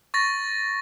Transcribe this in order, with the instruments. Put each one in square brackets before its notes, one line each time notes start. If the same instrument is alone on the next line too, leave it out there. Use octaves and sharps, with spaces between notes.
[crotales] C#6 A6 A#6